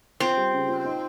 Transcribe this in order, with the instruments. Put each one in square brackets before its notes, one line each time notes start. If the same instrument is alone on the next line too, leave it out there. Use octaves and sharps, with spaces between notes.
[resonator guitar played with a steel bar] C4 [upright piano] F4
[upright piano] G3
C#3
F4
D#4